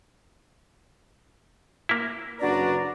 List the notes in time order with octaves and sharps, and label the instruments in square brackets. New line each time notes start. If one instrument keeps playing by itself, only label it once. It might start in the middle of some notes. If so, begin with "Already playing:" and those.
[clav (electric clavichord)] A#3 E4
[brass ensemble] F#1 B4 A#5 [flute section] D4 F#4 D5